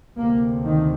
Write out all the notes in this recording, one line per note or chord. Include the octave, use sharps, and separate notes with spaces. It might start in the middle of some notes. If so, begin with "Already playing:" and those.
D2 C3 A#3
D#3